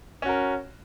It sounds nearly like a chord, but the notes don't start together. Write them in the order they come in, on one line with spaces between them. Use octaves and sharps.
C#4 F#4 A#4